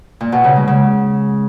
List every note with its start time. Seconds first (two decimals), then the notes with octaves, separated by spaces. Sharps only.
0.21 A#2
0.32 B2
0.44 C#3
0.56 G#3
0.68 C#3